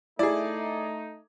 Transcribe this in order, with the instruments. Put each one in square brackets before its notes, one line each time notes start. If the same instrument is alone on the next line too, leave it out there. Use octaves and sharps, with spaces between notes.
[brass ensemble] A3 D#4 [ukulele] E4 [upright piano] G#4 D5